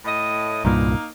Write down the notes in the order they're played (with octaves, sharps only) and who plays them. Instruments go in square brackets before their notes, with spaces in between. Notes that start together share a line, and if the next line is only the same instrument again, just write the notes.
[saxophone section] A2 D#5
[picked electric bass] C2 G2 A#2 [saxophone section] A#3 D#4